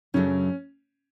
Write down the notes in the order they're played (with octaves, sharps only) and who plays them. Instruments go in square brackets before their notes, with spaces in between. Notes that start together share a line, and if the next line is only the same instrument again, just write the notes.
[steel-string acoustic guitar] F#2 C#3 F#3 A3 D4 [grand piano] C#4